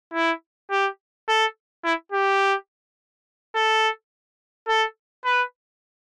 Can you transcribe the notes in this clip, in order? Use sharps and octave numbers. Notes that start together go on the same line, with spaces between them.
E4
G4
A4
E4
G4
A4
A4
B4